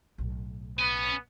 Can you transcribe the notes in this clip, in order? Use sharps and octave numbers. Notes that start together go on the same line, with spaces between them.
B1 A2
B3 C#4 G#5